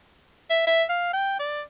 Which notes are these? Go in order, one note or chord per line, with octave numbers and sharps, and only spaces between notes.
E5
E5
F5
G5
D5